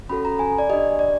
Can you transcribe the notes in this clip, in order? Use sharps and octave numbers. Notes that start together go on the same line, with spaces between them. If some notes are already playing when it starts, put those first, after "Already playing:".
C#4 F#4 A4 B5
A#5
G#5
D5
D4 G4 D#5
D5